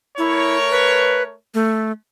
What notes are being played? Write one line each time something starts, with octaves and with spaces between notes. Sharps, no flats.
A3 E4 A#4 C#5
B4
A3